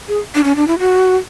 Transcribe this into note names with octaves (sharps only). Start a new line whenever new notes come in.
G#4
D4
C#4
D4
E4
F#4